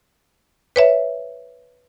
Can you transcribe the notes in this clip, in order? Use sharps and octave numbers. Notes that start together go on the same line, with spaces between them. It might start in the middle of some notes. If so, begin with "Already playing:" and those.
B4 C#5 E5